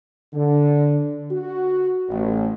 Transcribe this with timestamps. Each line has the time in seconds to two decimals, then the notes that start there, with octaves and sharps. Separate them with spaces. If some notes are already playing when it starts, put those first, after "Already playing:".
0.34 D3
1.31 F#4
2.09 A1